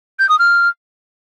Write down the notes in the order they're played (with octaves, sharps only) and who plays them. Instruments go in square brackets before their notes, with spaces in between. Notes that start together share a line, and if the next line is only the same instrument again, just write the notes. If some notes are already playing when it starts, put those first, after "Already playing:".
[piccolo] G6
D#6
F6